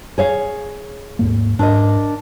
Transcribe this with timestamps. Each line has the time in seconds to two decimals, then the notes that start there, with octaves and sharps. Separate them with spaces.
0.18 G#4 C#5 F5
1.19 D#2 G#2 A#3
1.59 G#2 D4 A#4 D#5